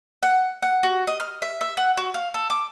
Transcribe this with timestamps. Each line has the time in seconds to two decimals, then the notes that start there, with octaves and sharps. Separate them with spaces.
0.23 F#5
0.62 F#5
0.83 F#4
1.07 D#5
1.20 F6
1.42 E5
1.61 E5
1.77 F#5
1.97 F#4
2.14 F5
2.34 A4
2.50 D6